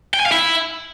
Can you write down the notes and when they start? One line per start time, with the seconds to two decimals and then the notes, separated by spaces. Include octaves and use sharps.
0.14 G5
0.20 G#5
0.26 F5
0.32 E4